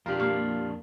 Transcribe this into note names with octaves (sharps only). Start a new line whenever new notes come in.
F2 D4 F4 G4 A#4
A#3 F5 C#6